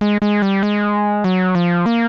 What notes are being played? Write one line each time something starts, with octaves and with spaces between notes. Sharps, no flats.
G#3
G#3
G3
G#3
F#3
F3
A#3